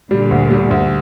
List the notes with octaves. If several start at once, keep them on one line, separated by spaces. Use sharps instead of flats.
A#2 D3 G3
D2
G3
D2